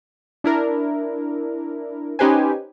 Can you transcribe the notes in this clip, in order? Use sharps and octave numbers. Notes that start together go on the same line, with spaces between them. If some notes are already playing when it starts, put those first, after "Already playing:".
D4 E4 A#4
C#4 D#4 G4 B4 C5 G#5